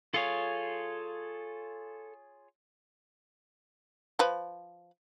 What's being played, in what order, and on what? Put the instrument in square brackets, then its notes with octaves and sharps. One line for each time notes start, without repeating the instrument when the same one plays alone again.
[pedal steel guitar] F4 G#4 C#5 [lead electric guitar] A4 F5
[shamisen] F3 B4